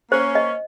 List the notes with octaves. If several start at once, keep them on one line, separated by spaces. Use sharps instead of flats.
A#3 C#4 C5
D#5